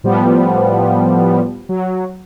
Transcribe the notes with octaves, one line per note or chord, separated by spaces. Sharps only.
A2 F3 G3 B3
F#3